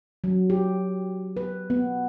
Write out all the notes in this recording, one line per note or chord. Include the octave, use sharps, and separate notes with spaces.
F#3
G4
B4
B3